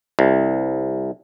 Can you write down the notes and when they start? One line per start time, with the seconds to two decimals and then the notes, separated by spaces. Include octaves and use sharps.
0.19 C2